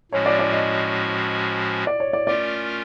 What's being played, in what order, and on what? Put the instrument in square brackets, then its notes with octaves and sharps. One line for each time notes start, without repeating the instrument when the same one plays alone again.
[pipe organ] A2 F3 G#3 C#4 F#4 [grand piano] C#5
[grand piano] D5
D5
D#5
D5
C#5
D5
[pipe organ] A3 C#4 F4 A#4 [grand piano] D5